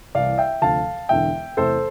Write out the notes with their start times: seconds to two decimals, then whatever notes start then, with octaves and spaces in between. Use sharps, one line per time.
0.15 C2 C3 E3 D5 F5
0.38 E5 G5
0.62 D2 C3 F3 F5 A5
1.09 E1 E2 D3 E5 G5
1.57 E2 C3 E3 A3 A4 C5